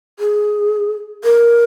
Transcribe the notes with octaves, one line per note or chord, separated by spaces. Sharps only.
G#4
A#4